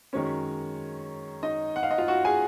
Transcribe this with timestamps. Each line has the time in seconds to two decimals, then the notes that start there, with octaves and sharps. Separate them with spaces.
0.13 F#2 D#3 G#3 C#4 C#5
1.43 D#4 D#5
1.76 F#5
1.83 F5
1.91 D#5
1.98 F4 F5
2.08 F#4 F#5
2.25 G#4 G#5